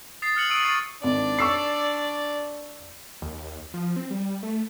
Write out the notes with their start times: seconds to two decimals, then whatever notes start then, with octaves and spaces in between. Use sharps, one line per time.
0.22 D#6 A6 C7
0.36 F6 F#6 C#7 F#7
0.50 C#6 D#6 E6 D7 D#7 F#7
0.63 C#6 A6 C7
1.03 G#1 D4 D5
1.39 C#6 E6 C7
3.22 D#2
3.74 F3
3.96 C4
4.11 G3
4.43 A3